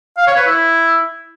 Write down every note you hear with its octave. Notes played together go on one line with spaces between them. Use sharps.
F5
C#5
B4
E4